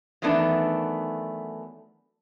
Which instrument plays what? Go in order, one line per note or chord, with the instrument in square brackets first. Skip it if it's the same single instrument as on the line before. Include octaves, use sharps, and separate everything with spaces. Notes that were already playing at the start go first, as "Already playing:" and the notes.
[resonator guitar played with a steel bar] D#3 E3 F#3 A3 B3 D4